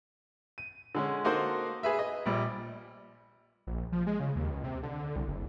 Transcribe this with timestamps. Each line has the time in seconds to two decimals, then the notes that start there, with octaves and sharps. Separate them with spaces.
0.58 D#7
0.95 D3 G#3 C#4
1.25 A#3 D#4 F#4 A4 C5
1.83 G#4 B4 E5
1.99 D#5
2.26 A#1 A#2 G3
3.67 A#1
3.92 F3
4.07 G#3
4.20 C#3
4.36 D#2
4.51 C#2
4.64 C3
4.83 D3
5.16 C2
5.28 F#1